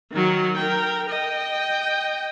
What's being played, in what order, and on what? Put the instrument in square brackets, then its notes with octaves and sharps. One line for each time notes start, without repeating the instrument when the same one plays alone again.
[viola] D#3 F#3
A#4 G5
D#5 G5